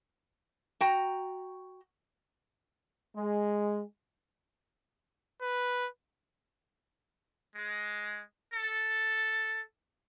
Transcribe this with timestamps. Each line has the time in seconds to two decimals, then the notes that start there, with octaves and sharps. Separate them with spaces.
0.81 F#4 G5 A#5
3.16 G#3
5.42 B4
7.56 G#3
8.54 A4